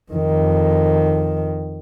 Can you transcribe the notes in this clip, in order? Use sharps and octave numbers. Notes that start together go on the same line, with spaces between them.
F2 D#3